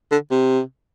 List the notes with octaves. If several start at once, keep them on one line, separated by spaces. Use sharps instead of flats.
D3
C3